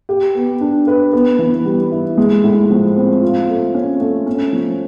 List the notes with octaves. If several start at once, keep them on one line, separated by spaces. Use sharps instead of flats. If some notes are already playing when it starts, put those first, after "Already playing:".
G4
B3
D4
B4
B3
E3
G3
E4
G#3
A2
F3
C4
F4
A3
C#4
A3
C#4
F3